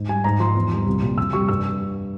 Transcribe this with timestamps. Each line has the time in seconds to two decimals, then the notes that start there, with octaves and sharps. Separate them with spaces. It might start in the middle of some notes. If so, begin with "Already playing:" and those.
Already playing: G#2
0.08 G3 G#5
0.24 G#2 A#5
0.40 F3 C6
0.55 E2
0.72 E3 G3
0.86 C2
1.02 A#2 G3
1.18 F2 E6
1.33 C3 G3 C#6
1.48 G2 E6